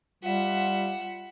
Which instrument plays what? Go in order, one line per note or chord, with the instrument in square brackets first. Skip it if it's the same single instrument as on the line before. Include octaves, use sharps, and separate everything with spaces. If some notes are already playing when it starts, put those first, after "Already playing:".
[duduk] G3 [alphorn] F4 [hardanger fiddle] E5 F#5